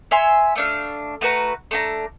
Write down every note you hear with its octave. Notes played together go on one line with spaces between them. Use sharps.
C#5 E5 G#5 C6
A3 D4 F5
A3 F#4 B4 A#5
A3 D4 A#5